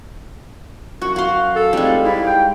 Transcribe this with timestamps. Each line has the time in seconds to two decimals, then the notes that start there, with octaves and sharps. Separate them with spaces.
1.02 F#2 F#4 C#6
1.16 F#4 F5 C6
1.56 A4
1.73 F1 G3 G#3
2.04 G#2 E4
2.27 G5